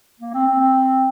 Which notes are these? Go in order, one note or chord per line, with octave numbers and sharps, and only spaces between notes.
A#3
C4
C4
C4